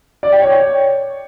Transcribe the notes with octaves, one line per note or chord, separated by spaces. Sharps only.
D5
G5
C#5